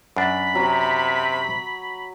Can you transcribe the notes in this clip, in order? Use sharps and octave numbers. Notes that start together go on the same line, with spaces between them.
F#2 D4 B5
C3 F#3